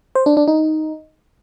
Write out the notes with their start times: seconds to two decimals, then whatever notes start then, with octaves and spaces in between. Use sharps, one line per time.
0.15 C5
0.26 D4
0.37 D4
0.48 D#4